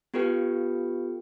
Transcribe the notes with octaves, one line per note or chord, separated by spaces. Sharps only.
B3 F4 G4 A4 B4 G5